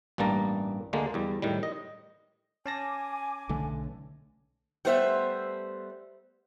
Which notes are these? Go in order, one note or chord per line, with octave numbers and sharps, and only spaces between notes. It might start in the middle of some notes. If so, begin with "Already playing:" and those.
A1 G2 G3 A#3 A5 A#5
D2 D3 G#3 A#3
E2 G3
A2 D#3 G3
D#5
C#4 G#5 A5 D6 A#6
B1 D3 A3
G3 A3 B3 C5 D#5 E5